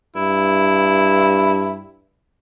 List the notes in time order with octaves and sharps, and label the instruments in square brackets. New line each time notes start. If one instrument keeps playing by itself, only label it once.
[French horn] G2 [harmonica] E4